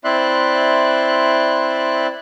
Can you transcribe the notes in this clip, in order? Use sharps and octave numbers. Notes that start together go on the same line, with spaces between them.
C4 E4 D5 E5 C6 F#6